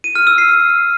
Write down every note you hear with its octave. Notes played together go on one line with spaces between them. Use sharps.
D#7
F6
E6
C7